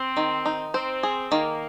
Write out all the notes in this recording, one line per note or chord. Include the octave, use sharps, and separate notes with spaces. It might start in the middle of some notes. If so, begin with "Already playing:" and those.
Already playing: C4 C5
D#3
D#4
C4 C5
G#4
D#3 A#3